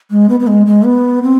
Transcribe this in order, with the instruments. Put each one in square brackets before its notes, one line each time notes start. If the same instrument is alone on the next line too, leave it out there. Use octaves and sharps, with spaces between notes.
[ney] G#3
B3
B3
G#3
G#3
B3
C4